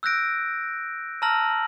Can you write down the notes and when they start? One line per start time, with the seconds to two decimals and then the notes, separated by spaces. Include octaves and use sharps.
0.03 E6 F#6 G6 A#6 D7
1.22 A5 A#5 E6 F6 A#6 F#7